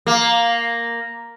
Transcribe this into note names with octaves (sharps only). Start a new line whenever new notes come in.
A#3